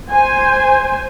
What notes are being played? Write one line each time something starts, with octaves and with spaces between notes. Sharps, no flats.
C5 G#5